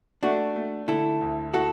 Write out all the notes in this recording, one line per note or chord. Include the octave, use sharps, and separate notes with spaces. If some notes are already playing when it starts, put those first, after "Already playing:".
A3 D4 F#4
A3
D3 E4 A4
D2
E4 F#4 A4